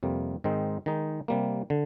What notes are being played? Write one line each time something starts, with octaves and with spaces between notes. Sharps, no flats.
F2 C3 G3 A#3
G#2 D#3 G#3 C4 D#4
D#3 G#3 D#4
C3 G3 A#3
D3